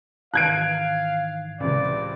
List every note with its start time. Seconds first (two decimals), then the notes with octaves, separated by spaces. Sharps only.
0.34 G#2 D#3 E3 F5 F#6 G#6 D7
1.60 C#2 A2 C3 E3 D5